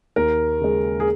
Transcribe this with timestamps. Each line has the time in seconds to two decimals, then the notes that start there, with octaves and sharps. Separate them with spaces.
0.16 D#2 A#4
0.61 C#3 G#3
1.00 G#4